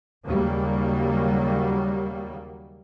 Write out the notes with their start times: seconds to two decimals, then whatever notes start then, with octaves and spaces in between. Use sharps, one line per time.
0.24 D#2 C#3 F#3 G3 A#3